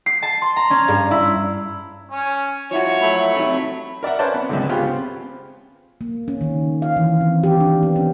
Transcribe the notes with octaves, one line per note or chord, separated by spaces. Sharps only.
C7
A5
C6
A#5
C#4
G2
E4
C#4
F3 E4 F#4 C#5
F#3 A3 B5
F2 C3 D#3
A#4 D5 E5 F#5
C#4 B4 C5 D5 A5
B3
C#2 G#2 D3
C#3 B3 F4 G4
C4
A#3
C#4
D#3
F5
E3
C4
G4
D4
B3
C#4